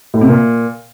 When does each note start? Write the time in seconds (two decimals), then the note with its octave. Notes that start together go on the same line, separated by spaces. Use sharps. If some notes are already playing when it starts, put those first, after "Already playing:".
0.14 A2
0.21 C3
0.29 A#2